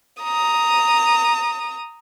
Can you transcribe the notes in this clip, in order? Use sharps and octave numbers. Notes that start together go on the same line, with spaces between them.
A#5 D#6